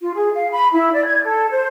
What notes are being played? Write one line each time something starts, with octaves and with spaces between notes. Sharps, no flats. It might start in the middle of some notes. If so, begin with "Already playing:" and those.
F4
G#4
F5
B5
E4
D5
G#6
A4
C5